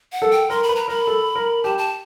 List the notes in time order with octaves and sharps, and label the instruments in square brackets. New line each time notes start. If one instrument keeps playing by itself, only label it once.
[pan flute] F#5
[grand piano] A4
[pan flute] G5
[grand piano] A#4 [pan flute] C6
[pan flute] B5
[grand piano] B4
[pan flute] A#5
[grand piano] A#4 [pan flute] B5
[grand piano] A4
A#4
[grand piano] G4 [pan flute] A5
[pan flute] A5